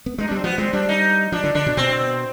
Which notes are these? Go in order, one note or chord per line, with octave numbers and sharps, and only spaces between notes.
B3
G#3 D#4
D4
G3 C4
F3 B3
G#3 C4
G3 D4
D#4
F3 D4
D3
D3 D4
B2
B2 C4